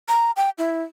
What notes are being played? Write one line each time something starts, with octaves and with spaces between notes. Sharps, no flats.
A#5
G5
E4